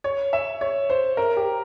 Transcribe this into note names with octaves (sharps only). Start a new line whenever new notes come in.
C#5
E5
C#5
C5
A#4
G4